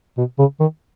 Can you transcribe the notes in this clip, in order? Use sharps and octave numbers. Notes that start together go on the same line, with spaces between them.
B2
C#3
D#3